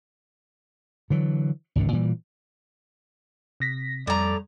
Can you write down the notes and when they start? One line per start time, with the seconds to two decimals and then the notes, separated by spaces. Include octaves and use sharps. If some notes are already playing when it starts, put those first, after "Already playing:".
1.10 D3 E3 F#3
1.76 G#1 C#2 G2 D3
1.93 A#2 E3 G3
3.60 C3 A#6 B6
4.07 F2 A2 G3 D5 A#5